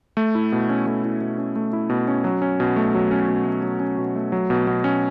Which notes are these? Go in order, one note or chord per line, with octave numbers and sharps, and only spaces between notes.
A3
E4
B2
C#4
A3
E4
B2
C#4
A3
E4
B2
C#4
F#3
C#4
B2
A3
F#3
C#4
B2
A3
F#3
C#4
B2
A3
F#3
B2
B2
C#4